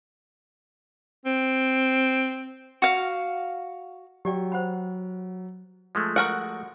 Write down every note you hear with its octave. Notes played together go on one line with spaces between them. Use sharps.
C4
F#4 F5
F#3 G4 D5 G5
C5 F#5 B5
F3 G#3 A3
F#4 A#4 F#5